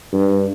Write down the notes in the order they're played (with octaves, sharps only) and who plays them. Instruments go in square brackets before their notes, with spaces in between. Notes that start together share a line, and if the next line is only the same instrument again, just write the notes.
[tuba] G2